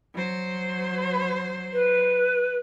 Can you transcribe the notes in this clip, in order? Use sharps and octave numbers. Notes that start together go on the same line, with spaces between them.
F#3 C5
B4